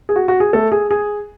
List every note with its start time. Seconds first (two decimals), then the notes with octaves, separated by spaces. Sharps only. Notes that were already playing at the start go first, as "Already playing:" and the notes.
0.09 G#4
0.16 F#4
0.28 F#4
0.40 G#4
0.53 A3 A4
0.72 G#4
0.91 G#4